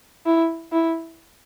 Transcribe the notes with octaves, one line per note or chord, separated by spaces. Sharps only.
E4
E4